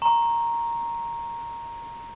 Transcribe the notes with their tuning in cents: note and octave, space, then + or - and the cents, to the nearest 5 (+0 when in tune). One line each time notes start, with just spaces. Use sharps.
A#5 +0 C#6 -40